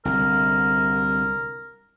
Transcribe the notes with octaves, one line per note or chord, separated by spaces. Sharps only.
C2 D3 A#4